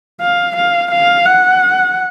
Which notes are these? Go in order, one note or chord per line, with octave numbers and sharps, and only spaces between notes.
F5
F5
F5
F#5